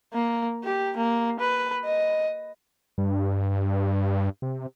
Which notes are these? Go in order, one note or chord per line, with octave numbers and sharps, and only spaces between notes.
A#3
G4
A#3
B4
D#5
G2
C3